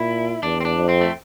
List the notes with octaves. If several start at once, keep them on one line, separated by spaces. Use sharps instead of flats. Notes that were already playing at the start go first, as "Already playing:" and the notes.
Already playing: A#2 E4
E2 D4
C4
D4
F2
C4
A3